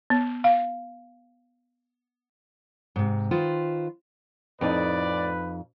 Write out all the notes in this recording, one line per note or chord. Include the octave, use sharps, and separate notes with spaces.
B3
F5
G#2 C3
D#3 F4 B4 C5
F2 A2 D#4 B4 D5